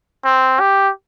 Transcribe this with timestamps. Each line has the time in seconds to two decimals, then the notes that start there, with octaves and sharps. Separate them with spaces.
0.25 C4
0.60 G4